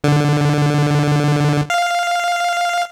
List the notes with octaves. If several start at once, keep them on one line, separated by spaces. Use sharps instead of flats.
D3
F5